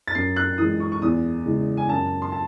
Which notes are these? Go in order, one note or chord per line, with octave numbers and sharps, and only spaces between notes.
A6
F#2 C7
F#6
E3 G#3 D#6
C#6
C#6
E2 D#6
C#3 E3 G#3
G#5
F#2 A5
C6
A5